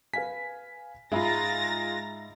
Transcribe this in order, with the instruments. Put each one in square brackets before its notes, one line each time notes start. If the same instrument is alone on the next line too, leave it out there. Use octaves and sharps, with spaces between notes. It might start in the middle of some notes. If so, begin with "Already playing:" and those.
[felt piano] B4 F5 G#5 [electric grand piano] B6
[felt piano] G#2 E5 B5 [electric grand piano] G#3 F4 [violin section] A#5 A6 A#6